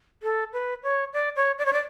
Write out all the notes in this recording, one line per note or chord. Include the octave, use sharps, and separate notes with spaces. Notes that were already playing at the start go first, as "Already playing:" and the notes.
A4
B4
C#5
D5
C#5
D5
C#5
D5